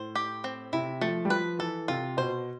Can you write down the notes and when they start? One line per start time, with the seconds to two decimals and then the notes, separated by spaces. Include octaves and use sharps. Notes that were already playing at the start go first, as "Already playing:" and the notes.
Already playing: A2 C5
0.15 G4
0.44 C4
0.73 C3 E4
1.01 F3 A3
1.25 G3
1.30 F3 B4
1.59 E3 A4
1.88 C3 F4
2.17 B2 C5